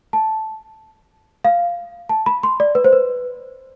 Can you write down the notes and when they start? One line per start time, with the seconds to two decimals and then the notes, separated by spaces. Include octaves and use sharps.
0.13 A5
1.45 F5
2.09 A5
2.26 B5
2.43 C6
2.60 D5
2.75 B4
2.84 C5
2.93 B4